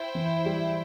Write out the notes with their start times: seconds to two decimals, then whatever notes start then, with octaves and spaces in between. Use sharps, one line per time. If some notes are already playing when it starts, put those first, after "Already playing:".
Already playing: E4 C5 G5
0.15 E3
0.46 G3